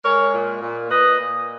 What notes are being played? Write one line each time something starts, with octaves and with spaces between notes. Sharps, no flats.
G#3 A#4 C#5
A#2
A#2
A#2 B4 D#5
A#2